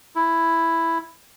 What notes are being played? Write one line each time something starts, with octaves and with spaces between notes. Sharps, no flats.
E4